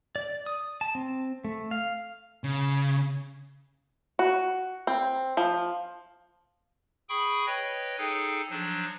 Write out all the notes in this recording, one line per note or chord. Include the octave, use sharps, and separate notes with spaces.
D5
D#6
A5
C4
A3
F5
C#3
F#4
C4
F3
G#4 G5 B5 C#6 D#6
B4 C#5 D#5 G5
D#4 G#4 A4 G5
F3 F#3 D4